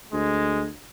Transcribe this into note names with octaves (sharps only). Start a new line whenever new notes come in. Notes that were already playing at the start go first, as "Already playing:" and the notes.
D2 G#3